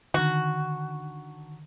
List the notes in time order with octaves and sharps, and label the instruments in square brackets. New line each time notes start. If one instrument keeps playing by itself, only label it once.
[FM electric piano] D3 D#3 [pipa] F#4